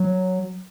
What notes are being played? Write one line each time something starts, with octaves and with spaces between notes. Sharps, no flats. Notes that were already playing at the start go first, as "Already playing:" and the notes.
Already playing: F#3